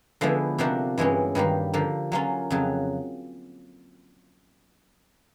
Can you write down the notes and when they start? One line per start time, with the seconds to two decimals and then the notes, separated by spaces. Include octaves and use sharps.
0.21 D3 F3 G#3 B3 E4
0.58 C3 F3 A#3 D4 F#4
0.98 G2 E3 G#3 C#4
1.35 G2 D#3 G3 A#3
1.74 D3 F3 A#3
2.12 F#3 A#3 C#4 F4
2.50 F2 C#3 F#3